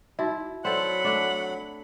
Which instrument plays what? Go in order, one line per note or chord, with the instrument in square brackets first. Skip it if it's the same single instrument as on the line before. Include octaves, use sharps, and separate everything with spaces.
[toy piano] D#4 F#4 E5 [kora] E4
[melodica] F#3 B5 [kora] C4 A4 [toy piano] D5 [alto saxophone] F#5
[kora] A3 D4